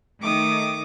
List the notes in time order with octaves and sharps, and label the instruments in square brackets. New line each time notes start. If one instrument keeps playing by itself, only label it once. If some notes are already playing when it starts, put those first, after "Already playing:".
[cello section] D#3 A3 [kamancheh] D6 D#6